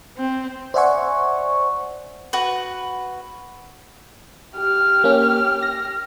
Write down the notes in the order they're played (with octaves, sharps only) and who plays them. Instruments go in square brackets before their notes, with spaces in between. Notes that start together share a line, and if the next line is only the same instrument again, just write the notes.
[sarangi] C4
[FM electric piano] C5 D5 E5 F#5 G#5 C#6
[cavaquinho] F#4 B4
[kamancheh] G4 F6
[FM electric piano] A#3 C#4
A#6